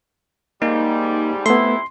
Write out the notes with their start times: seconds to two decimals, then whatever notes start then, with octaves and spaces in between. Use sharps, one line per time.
0.62 G#2 G3 A#3 D#4
1.46 F2 C3 A3 B3 E4 C6